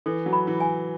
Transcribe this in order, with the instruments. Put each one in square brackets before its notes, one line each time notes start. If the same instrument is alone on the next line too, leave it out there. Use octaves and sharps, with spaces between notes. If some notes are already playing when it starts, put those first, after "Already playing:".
[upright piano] E3 [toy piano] A4
[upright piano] F#3
[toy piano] B5
[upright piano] E3
[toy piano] G#5